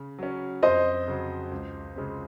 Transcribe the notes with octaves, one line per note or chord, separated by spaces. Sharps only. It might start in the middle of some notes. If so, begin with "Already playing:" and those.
Already playing: C#3
F#3 C#4
F2 C5 D#5
C#3 F#3
C#2
C#3 G#3 C4